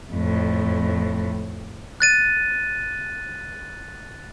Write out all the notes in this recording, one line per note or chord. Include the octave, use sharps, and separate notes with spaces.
F2 A2
F#6 A6 D#7